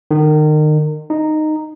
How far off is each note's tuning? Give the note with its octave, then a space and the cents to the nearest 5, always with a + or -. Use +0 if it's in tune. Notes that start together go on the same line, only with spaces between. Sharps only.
D#3 -30
D#4 -10